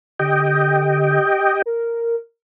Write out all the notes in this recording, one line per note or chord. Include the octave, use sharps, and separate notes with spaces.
D3 G4 D#5 G5
A#4